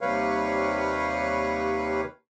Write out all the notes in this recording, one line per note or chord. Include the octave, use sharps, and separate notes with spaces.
D#2 C3 G3 B4 C#5 F5